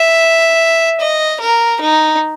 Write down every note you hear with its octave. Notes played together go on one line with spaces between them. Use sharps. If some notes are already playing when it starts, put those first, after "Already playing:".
Already playing: E5
D#5
A#4
D#4